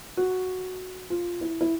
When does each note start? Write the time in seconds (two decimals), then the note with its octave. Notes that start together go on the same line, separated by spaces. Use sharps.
0.17 F#4
1.10 F4
1.41 E4
1.61 E4